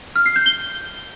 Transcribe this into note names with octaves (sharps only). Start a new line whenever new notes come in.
F6
C7
G6
G7